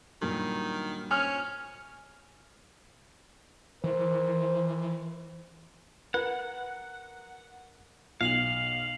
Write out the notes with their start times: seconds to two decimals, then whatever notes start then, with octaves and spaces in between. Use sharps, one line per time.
0.22 G2 A#2 D#3 F#3
1.11 C#4 F6
3.84 E3 A#4 C5
6.14 A#4 B4 F#5
8.21 B1 F5 C7 F7 F#7